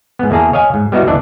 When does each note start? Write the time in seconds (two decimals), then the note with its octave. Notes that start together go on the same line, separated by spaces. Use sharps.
0.19 G#2 B3
0.31 E2 A#3 G#4 A5 A#5
0.53 C#5 D#5 F5 G#5
0.74 G#2
0.92 G3 B3 D#4 E4 F#4
1.06 G1 D#2 D#3 E3 D4 D5